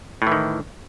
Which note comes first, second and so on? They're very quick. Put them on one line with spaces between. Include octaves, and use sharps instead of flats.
A2 E3 D#3